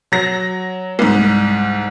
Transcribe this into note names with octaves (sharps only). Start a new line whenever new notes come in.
F#3 A#6
C2 G#2